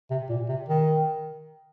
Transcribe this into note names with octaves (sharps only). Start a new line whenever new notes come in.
C3
A#2
C3
D#3